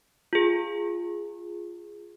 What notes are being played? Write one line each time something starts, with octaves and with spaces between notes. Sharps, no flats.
F4 G#4